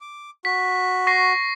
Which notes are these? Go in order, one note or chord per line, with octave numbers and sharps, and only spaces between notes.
D6
F#4 B6
C#6 A#6 C7